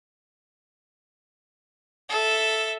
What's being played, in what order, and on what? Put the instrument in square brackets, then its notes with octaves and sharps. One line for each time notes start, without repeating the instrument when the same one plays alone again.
[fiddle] A4 E5